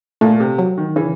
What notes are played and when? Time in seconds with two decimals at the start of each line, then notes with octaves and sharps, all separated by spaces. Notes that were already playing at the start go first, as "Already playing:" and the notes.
0.21 A#2 A3
0.40 C3
0.58 F#3
0.78 D#3
0.96 C#3 E3